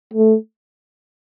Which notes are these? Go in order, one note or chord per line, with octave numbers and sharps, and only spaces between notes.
A3